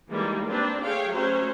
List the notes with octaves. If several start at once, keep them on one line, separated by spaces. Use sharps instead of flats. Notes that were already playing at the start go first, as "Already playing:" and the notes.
D#3 E3 G3 G#3 A#3
A#3 C4 D4 B4
A3 G#4 C#5 F5 G5
F#3 A3 C#4 C5 C#5